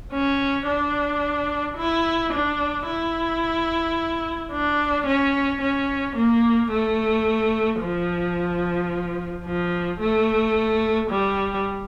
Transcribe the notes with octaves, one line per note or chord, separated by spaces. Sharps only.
C#4
D4
E4
D4
E4
D4
C#4
C#4
A#3
A3
F3
F3
A3
G3